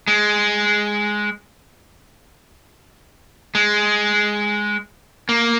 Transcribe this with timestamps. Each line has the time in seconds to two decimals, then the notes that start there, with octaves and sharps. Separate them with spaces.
0.08 G#3
3.55 G#3
5.29 A#3